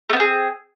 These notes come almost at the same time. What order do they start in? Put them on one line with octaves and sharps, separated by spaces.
A3 B3 C4 G#4